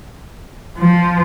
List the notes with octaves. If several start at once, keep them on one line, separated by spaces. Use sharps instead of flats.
F3